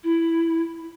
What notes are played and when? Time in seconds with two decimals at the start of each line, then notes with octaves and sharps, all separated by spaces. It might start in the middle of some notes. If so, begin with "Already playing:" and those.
0.04 E4